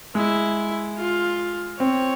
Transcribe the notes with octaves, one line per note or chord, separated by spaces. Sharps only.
G#3 E4
F4
C4 C#5